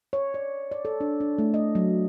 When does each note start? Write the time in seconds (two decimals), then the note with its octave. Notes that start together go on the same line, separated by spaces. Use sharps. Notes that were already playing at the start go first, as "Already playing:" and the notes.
0.13 C#5
0.34 D5
0.71 D5
0.85 A4
1.01 D4
1.20 D4
1.38 A3
1.54 D#5
1.75 F#3